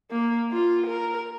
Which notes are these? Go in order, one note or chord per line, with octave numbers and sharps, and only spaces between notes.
A#3
F4
A#4